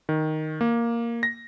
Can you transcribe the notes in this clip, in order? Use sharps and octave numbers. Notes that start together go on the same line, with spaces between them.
D#3
A#3
A#6